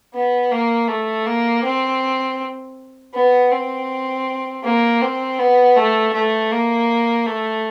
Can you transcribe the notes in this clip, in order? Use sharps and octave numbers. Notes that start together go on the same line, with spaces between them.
B3
A#3
A3
A#3
C4
B3
C4
A#3
C4
B3
A3
A3
A#3
A3